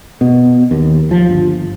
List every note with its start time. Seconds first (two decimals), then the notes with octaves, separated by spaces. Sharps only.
0.21 B2
0.71 D#2
1.11 F3
1.29 G1